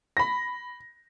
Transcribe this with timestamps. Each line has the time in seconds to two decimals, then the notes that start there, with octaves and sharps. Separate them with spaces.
0.17 B5 A#6